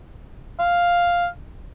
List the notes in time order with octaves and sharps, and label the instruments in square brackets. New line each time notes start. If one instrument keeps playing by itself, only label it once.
[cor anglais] F5